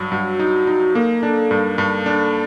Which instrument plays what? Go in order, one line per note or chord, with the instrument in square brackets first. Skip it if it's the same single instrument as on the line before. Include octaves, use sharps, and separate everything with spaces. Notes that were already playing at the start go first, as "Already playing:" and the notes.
Already playing: [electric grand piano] G2 F#3
[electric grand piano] G2 [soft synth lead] F#4
[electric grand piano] D#4
D#4
[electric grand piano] A#3 [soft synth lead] A4
[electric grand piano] D4
G2
G2
D4